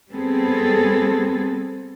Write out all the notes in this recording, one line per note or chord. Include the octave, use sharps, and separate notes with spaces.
G3 B3 C4 G#4 A4